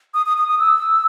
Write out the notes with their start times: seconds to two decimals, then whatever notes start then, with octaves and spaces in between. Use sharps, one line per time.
0.14 D#6
0.26 D#6
0.37 D#6
0.48 D#6
0.59 E6